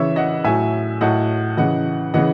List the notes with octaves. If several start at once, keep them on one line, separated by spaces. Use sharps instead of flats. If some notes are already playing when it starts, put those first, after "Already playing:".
Already playing: C#3 E3 C#5 E5
D#5 F#5
A2 F#3 E5 G#5
A2 F#3 D#5 F#5
C#3 E3 D#5 F#5
C#3 E3 D#5 F#5